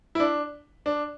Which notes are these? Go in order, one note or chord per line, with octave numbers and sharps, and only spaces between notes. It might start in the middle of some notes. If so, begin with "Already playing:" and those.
E4
D4
D4